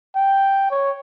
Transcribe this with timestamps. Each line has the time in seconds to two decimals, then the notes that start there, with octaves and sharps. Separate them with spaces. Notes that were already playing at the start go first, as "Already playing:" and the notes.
0.16 G5
0.71 C#5